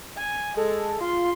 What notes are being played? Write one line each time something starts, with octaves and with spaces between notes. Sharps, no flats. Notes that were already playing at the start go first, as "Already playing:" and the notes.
G#5
G#3 A4
F4 C6